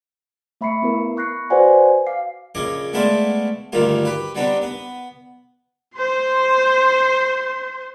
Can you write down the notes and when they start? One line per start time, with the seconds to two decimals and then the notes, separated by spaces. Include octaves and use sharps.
0.61 A3 E5 B5 C#6 C7 C#7
0.82 B3 E4 A#4
1.16 B5 C#6 F#6 A#6 C7 C#7
1.50 F#4 B4 C5 D5 F#5 G#5
2.07 F5 D6 C7
2.55 A#1 C#3 C#4 D#5 D6
2.93 G#3 A3 B3 C5 D5 F5
3.72 D2 G2 D#3 A#3 F4 G4
4.05 G4 B4
4.35 G3 B3 C4 D4 D#4
4.62 B3
5.97 C5 C6